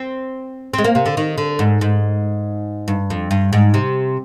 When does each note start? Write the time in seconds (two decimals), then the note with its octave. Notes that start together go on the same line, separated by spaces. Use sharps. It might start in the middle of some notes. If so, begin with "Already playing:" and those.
Already playing: C4
0.74 G#3 C4
0.84 A#3
0.95 C3
1.06 D3
1.17 D#3
1.38 D3
1.59 G#2
1.81 G#2
2.88 G2
3.10 F2
3.31 G2
3.53 G#2
3.74 C3